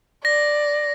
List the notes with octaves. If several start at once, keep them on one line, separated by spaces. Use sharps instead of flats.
D5 A#6